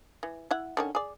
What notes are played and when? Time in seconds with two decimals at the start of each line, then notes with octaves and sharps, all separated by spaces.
0.23 E3
0.51 E4 E5 F#5
0.77 D3 D#3 C#4
0.95 G#4 D5